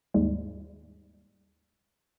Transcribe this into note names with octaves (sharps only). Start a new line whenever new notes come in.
D#2 G#2 G3 G#3